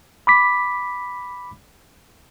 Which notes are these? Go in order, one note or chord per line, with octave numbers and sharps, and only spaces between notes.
B5 D6 B6